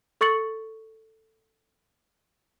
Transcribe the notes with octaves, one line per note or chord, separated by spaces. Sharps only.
A4 C#6 A6 C#7 F#7